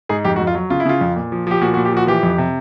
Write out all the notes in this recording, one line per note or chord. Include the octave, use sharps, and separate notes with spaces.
G#2 G#4
F2 G4
F#4
F2
F4
F#3
C#3 F4
E4
C#3 F4
F2
A#2
F3
F3 G4
A#2 F#4
F#4
A#2
G4
F3 F#4
E3 G4
F2
C3